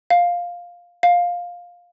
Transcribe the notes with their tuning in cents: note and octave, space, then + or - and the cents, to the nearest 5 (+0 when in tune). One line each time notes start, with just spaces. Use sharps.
F5 +5
F5 +10